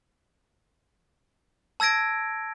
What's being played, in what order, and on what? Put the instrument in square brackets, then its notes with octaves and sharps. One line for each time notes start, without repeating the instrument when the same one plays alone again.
[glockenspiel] A5 E6 G#6 A#6 D7